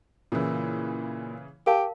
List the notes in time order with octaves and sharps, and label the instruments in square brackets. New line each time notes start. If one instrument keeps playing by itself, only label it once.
[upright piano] A#2 E4 [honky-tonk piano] C#3 E3
[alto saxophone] G4 [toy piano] A#4 F5 A5